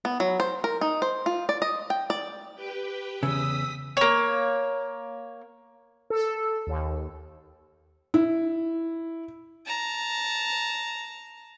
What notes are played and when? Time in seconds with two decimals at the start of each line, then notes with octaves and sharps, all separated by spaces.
0.05 B3
0.20 F#3
0.40 C5
0.64 A#4
0.81 D#4
1.02 C5
1.26 F4
1.49 D5
1.62 D#5
1.90 G5
2.10 D5
2.55 G4 B4 G5
3.23 E2 C#3 D#6 E6 B6
3.97 A#3 C#5
6.10 A4
6.67 D#2
8.14 E4
9.66 A5 A#5